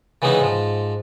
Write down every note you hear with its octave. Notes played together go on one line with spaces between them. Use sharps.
C#3 E3 G#3 B3 D#4 E4
G#2 F3